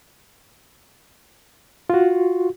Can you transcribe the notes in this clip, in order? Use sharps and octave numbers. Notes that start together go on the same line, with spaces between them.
F4 F#4